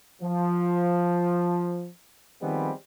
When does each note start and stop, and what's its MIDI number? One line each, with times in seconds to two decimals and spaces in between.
0.22 1.89 53
2.42 2.71 51
2.42 2.71 53
2.42 2.71 55
2.42 2.71 56
2.42 2.71 59
2.42 2.71 60